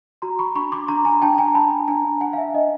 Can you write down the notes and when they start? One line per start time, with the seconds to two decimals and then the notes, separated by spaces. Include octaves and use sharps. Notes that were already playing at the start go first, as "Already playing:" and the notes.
0.22 F#4 A#5 C6
0.39 B5 C#6
0.55 D4 B5 C#6
0.72 C6 D6
0.88 D4 A#5 C6
1.05 G#5 A#5
1.22 D4 G5 A5
1.38 G#5 A#5
1.55 D4 A5 B5
1.88 D4 G#5 A#5
2.21 D4 F#5 G#5
2.33 F5
2.38 E5
2.54 D4 D#5